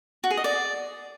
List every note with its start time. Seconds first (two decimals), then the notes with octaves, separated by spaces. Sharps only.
0.24 F#4
0.31 G#4
0.37 D#5
0.44 D5